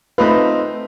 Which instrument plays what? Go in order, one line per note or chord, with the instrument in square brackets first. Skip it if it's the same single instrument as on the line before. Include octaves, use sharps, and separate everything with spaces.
[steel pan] A3 B4 [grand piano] C4 D#4 F4